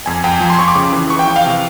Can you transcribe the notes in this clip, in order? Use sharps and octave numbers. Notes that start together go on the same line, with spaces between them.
F2 G#5
F2 G5
F3 G#5
C6
F2 C#6
D6
C#3
E3
E3 C#6
G5
E3
F5
C3